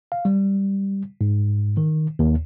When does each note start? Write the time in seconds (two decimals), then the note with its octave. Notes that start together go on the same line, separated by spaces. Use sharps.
0.12 F5
0.25 G3
1.21 G#2
1.77 D#3
2.19 D#2